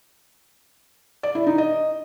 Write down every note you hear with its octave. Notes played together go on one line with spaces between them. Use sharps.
D5
E4
D#4
D#5